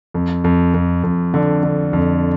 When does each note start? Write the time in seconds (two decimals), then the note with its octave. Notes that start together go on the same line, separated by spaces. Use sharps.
0.14 F2
0.44 F2
0.74 F2
1.03 F2
1.34 D3
1.63 D3
1.93 F2